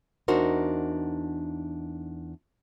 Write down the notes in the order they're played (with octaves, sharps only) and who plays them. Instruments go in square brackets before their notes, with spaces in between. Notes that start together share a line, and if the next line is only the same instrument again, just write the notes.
[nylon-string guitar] E2 D4 D#4 F#4 A#4 C5